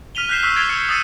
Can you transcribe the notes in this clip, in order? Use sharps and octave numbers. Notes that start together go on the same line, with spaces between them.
F6 B6 D#7 F7 G7
F#6 G6 B6 C7 E7
C#6 E6 C7
G#6 A6 D7 E7 F7 G7
E6 C#7
D#6 E6 A6 C7 C#7 D#7